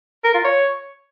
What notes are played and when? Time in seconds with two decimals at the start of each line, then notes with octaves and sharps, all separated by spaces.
0.24 A#4
0.34 F4
0.45 C#5